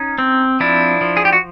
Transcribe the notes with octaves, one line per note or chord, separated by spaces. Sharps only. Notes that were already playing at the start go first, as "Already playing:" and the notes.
Already playing: C#4 D#4
C4
F3 D4 E4
F3
G#4
G4
F#4